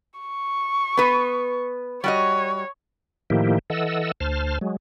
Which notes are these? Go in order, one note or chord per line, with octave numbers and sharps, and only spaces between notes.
C#6
B3 B4
G3 F#4 C#5 D#5
A2 D#3 F3 A#3 E4 G4
E3 A4 D#5 F#5 E6
D2 C5 A5 F6
F#3 G#3